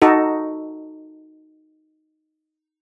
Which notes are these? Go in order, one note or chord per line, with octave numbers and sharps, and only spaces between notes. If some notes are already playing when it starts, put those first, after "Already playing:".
D#4 F#4 A4